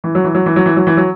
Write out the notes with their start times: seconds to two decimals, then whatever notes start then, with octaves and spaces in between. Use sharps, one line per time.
0.04 E3
0.15 F#3
0.24 E3
0.35 F#3
0.46 E3
0.56 F#3
0.66 E3
0.76 F#3
0.87 E3
0.97 F#3